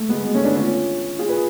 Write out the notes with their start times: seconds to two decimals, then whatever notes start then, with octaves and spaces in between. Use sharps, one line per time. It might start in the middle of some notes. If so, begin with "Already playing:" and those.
Already playing: A3
0.09 G#3 B3
0.25 G#3 B3
0.35 A3 C#4
0.45 B3 D4
0.56 C#4 F4
1.19 F4 G#4
1.29 G#4 B4